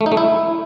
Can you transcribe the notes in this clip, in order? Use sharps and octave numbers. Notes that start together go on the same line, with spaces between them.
A3
D#4
A3
E4